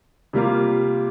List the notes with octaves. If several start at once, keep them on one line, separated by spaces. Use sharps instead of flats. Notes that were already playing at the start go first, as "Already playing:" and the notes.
C3 G3 A#3 F4